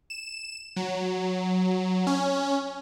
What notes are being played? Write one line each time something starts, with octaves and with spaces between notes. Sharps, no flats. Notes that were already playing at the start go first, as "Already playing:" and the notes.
E7
F#3
C#4